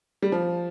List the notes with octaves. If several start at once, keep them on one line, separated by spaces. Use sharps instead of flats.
G3
F3